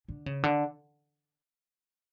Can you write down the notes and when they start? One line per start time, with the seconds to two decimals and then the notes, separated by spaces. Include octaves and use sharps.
0.08 D3
0.26 C#3
0.43 D3